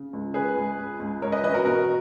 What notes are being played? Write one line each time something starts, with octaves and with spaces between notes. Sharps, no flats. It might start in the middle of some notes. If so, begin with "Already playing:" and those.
Already playing: C#3
C#2
C#3 G#4 B4
C#2
C#2
C#2
C#2 A#4 C#5
B4 D#5
E3 B4 D#5
F#4 A#4
B2 F#4 A#4